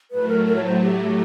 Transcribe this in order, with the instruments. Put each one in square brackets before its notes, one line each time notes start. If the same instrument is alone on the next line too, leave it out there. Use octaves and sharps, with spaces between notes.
[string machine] A2 F#3 A3 [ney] B4
[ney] A#4
A#4
C#5
C5
G4